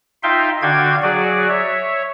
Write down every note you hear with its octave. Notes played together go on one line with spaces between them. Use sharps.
D#4 F4 E5 F5 G5 C6
D3 D4 F#4 F5 G5 G#6
F#3 F#4 G#4 D5
C#5 E5